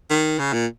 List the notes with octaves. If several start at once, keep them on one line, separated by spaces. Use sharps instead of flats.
D#3
C#3
A#2